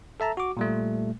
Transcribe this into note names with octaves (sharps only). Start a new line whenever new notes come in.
A4 E5 A5 A#5
F#4 D6
A#2 G3 A3